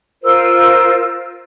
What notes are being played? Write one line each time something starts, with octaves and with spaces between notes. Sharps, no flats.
F4 A#4 C5 E6